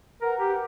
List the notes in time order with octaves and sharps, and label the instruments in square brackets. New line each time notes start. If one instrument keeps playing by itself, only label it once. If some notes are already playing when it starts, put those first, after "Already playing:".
[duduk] A#4 [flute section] B4 F#5 A#5
[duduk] G4